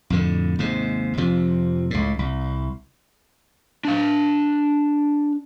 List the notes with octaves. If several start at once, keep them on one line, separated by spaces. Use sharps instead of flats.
F2 A2 D3
D#2 G#2 C3
F2 C3 F3
C#2 A2
C2
D4 F5